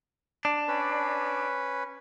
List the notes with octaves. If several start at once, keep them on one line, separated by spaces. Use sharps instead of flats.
D4
C#4 B4